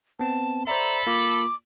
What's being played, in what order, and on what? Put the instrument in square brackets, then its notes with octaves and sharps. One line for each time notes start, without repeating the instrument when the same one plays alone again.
[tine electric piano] B3 C4 [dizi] A5
[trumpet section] A4 B5 [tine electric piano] C5 D5 E5 [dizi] A#5
[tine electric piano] A#3 F4 [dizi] D6